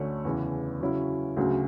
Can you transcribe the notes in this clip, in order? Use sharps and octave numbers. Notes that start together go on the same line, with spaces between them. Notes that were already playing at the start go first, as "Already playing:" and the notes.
Already playing: D2 D3 A3 C#4
E2 C#3 E3
C#3 F#3 C#4 E4
D2 C#3 F#3